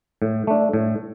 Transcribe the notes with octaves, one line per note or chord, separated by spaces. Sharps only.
A2
A3 D4
A2